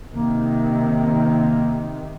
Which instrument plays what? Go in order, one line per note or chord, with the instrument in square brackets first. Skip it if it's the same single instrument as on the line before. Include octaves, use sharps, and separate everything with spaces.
[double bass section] C3 D#3 [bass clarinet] A#3